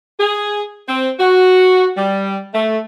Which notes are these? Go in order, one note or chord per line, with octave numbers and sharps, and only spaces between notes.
G#4
C4
F#4
G3
A3